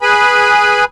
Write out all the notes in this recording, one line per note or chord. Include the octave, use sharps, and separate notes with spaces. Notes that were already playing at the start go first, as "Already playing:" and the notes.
G#4 B4 G#5 B5